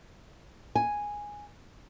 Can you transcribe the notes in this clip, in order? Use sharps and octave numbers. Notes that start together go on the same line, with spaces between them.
G#5